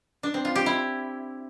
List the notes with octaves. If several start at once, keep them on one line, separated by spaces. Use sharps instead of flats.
D4
C4
F4
G4
E4